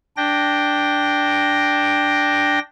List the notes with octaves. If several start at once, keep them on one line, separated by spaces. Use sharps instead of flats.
D4 G5 A#6